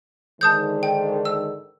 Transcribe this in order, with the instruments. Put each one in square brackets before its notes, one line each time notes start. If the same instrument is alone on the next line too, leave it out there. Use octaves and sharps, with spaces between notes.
[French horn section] G#2 D3 D#3 [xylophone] A5 D#6 G6
[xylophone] G5
E6